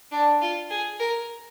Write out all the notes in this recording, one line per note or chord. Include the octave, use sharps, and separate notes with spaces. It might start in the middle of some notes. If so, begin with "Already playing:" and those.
D4
F4
G#4
A#4